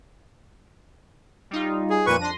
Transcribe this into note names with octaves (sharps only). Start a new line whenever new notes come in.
G3 D#4 F4
G#4
F2 A#2 B4 C#6 D#7
D4 C6 A#6